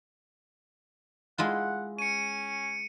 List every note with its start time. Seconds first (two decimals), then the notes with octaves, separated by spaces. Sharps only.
1.38 G#3 E4 F4 F#5
1.99 C#4 C#7 D#7